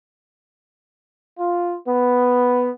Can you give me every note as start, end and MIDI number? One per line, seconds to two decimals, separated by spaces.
1.38 1.73 65
1.87 2.68 59